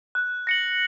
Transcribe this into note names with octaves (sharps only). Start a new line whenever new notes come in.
F#6
A#6 C#7 F#7